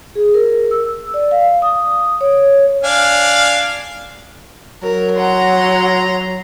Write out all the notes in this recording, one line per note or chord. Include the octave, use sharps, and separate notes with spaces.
G#4
A#4
E6
D5
F5
D#6
C#5
D4 F5 G#5
F#3 A#4
F#5 A#5 C6